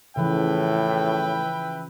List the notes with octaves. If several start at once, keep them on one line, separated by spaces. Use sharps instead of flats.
A2 C#3 E3 F3 B4 E5 G5